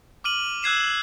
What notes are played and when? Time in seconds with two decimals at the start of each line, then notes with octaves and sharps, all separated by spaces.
0.24 D6 F6 D#7 F#7
0.63 E6 F#6 G#6 C7 E7